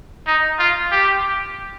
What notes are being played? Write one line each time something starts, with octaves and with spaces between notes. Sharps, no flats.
D#4
F4
G4